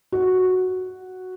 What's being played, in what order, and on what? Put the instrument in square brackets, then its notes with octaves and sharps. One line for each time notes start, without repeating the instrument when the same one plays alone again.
[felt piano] F#4